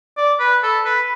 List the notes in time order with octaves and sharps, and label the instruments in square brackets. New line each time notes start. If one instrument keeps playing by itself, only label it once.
[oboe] D5
B4
A4
B4